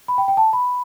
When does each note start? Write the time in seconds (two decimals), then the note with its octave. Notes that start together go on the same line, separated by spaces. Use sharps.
0.08 B5
0.18 G5
0.28 G5
0.37 A5
0.53 B5